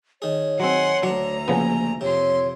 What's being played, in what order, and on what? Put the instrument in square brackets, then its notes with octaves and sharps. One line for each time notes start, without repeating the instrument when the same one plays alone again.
[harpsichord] D#3 G#4 [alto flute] C#5
[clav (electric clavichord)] F#3 C4 [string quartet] F#5 G#5 C6
[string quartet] D2 A#5 [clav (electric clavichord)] F#3 [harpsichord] D4
[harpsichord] A#1 [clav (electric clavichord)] C#3 F3 B3 [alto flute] G#5
[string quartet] F2 C6 [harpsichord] C3 [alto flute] C#5